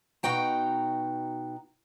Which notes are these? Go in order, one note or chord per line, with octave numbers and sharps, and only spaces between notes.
B2 D#4 F#4 G5 A#5